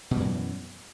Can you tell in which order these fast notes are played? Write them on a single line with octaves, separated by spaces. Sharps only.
B2 G3 E3 F#2